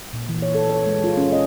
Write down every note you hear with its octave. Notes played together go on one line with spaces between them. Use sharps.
A#2
E3
C#5
A4
C#5
G#3
F4
C#4
D#5